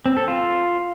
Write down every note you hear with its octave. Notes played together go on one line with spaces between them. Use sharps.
C4
A4
F4